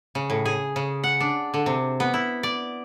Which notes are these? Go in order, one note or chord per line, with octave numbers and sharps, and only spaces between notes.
C#3
A2
G#4
C#3
F#5
D4
D3
C3
B3
E4
D5